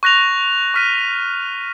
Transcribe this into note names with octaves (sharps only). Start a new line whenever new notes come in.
C#6 F#6 A#6 F7
C#6 F6 B6 D#7